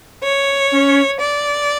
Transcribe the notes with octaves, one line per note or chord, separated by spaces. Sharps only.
C#5
C#4
D5